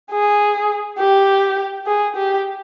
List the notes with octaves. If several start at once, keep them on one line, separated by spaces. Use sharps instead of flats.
G#4
G4
G#4
G4